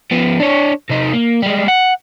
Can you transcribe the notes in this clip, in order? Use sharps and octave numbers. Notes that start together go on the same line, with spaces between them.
F3 B3
D4 C#5
C3 D#4
A#3
G3 G#3
F#5